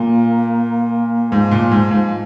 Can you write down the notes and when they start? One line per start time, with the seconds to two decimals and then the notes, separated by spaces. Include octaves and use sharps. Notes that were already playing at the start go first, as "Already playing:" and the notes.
Already playing: A#2 A#3
1.31 G#2 F3
1.51 A#2
1.71 G#2 F3
1.91 G#2
2.10 F3